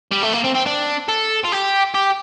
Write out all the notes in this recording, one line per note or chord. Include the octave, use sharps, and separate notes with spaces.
G3
A3
A#3
C4
C4
D4
A4
F4
G4
G4